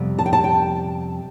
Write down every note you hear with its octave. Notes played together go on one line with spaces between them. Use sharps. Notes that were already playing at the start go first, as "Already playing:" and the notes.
Already playing: F2 C3 G3 B3
A5
G5
A5
G5